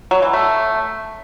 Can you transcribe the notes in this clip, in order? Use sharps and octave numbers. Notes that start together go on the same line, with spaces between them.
F#3
E3
A3